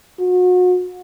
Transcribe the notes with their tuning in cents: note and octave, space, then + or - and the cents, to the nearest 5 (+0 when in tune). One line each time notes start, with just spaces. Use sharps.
F#4 -35